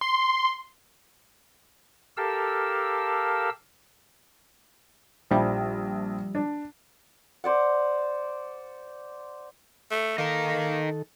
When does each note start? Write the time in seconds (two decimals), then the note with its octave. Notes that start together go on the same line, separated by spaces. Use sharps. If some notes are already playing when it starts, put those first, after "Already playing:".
0.01 C6
2.17 G4 A4 A#4 F5 A5 E6
5.31 A#1 F3 G3 E4 A5
6.35 D4 D5
7.44 C5 D5 F#5
9.91 A3
10.18 D#3 A#3 D#4 A4 A#4